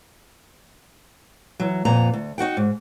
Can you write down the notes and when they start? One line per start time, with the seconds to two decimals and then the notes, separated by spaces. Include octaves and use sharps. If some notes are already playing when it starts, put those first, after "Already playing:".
1.60 E3 F#3
1.85 F2 A#2 B3 A#5
2.13 D2
2.38 D#4 F#4 F#5 G5
2.57 G#2